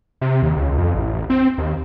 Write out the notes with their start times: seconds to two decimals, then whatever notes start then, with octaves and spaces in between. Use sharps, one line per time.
0.21 C3
0.43 D#2
0.56 C#2
0.78 F2
0.95 A1
1.30 C4
1.58 D#2